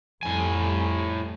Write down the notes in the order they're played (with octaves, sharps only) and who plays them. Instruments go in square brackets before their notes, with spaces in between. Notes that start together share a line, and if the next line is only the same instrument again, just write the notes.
[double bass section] F2 G3 [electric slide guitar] A2 G#5